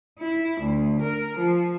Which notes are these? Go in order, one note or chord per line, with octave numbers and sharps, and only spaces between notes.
E4
D2
A#4
F3